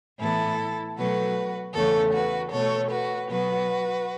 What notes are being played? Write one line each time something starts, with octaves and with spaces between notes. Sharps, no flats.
A2 E3 B3 E4 A4
B2 F#3 A3 F#4 B4
E2 C#3 A3 A4 C#5
F#4 B4
B2 A3 A4 C#5
F#4 B4
B2 F#3 B3 F#4 B4